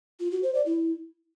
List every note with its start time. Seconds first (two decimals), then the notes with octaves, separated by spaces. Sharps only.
0.20 F4
0.31 F#4
0.43 C5
0.54 D5
0.66 E4